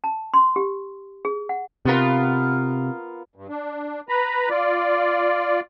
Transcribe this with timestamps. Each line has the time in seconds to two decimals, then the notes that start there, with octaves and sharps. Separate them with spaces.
0.04 A5
0.34 C6
0.56 G4
1.25 G#4
1.49 F#5
1.85 C3 B3 F4 A#4
3.36 G2
3.49 D4
4.09 B4 A#5 B5
4.50 F4 D5